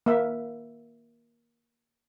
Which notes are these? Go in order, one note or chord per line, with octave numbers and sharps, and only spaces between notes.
A#3 E5